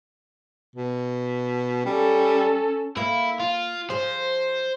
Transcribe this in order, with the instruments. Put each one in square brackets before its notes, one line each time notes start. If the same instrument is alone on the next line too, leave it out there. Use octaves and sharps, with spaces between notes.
[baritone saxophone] B2
[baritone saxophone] G3 [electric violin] C#4 A4
[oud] A#3 [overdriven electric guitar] E4
[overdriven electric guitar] F4
[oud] F3 G#4 [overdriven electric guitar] C5